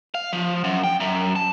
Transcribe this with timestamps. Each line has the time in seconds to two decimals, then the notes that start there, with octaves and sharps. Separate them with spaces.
0.15 F5
0.33 F3
0.64 F#2
0.84 G5
1.00 F#2
1.36 A5